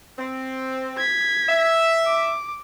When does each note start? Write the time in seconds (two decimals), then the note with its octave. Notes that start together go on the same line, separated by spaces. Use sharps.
0.19 C4
0.98 G#6 B6
1.49 E5
2.06 D6